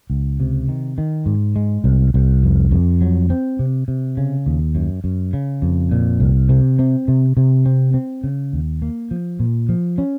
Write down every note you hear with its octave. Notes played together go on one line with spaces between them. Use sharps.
C#2
C3
D#3
D#3
G#2
G#3
C2
C2
F2
F2
F#3
C4
C3
C3
C#3
D#2
F#2
F#2
C#3
F2
A#2
C2
C3
C4
C3
C3
C4
C4
C#3
D#2
A#3
F3
A#2
F3
C#4